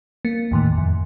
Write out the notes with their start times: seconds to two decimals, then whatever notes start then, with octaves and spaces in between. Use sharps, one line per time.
0.25 A#3
0.51 E2 A2 D#3
0.77 F2